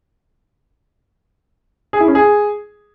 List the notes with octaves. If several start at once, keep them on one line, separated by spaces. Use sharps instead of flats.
G#4
E4
C#4
G#4